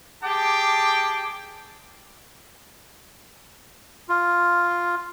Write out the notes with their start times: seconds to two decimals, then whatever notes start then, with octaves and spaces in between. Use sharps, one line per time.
0.24 G4 G#4 G5 A5 D6
4.09 F4